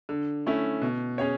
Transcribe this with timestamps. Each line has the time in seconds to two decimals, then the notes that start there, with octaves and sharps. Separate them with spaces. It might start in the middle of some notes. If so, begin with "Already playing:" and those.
0.09 D3
0.46 A3 C#4 E4
0.82 B2
1.18 C#4 G#4 C#5